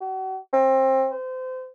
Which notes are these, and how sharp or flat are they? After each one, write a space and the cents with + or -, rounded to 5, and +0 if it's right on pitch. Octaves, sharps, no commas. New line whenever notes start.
F#4 +40
C4 +25
C5 -30